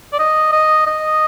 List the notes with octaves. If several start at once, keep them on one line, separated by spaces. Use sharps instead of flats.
D5
D#5
D#5
D#5